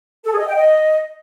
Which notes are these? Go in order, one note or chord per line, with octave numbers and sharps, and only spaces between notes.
A4
G#4
D#5
G5
D#5